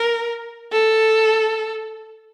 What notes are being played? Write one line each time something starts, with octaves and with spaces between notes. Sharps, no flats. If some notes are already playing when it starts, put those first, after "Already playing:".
Already playing: A#4
A4